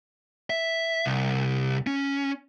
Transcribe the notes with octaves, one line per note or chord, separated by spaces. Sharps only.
E5
C2
C#4